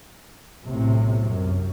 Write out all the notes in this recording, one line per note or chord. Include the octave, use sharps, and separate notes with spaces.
B1 A2 C3
F#2